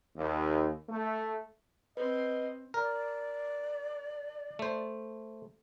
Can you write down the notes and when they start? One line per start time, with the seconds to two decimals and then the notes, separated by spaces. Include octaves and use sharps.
0.16 D#2
0.89 A3
1.97 C4 B4 D#5
2.74 A#4 D5
4.59 A3 C5